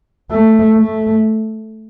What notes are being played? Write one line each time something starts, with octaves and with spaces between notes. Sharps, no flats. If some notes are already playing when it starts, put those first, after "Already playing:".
A3
A3